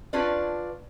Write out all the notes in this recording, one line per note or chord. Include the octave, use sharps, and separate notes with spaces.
C#4 D4 F4 B4 D5